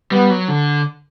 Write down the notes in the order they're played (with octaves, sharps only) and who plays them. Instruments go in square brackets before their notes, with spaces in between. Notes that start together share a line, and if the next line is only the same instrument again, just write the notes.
[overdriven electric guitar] G3 [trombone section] B3
[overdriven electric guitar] F#3
D3